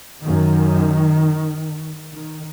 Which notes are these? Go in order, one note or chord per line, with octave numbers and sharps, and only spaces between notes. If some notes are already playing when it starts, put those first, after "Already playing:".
F#2 D#3
D#3